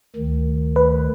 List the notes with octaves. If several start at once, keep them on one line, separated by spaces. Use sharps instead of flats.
D2 D#3
B4